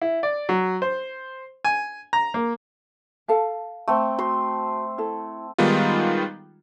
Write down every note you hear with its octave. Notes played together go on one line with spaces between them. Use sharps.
E4
D5
F#3
C5
G#5
A#5
A#3
A4 F5 A5
A3 C4
F#4 C6
E4 A4
D#3 G3 G#3 B3 D#4 F4